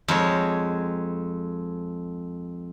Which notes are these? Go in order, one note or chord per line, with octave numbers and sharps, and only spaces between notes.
F2 G#3 C#5